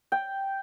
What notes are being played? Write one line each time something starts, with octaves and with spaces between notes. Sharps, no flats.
G5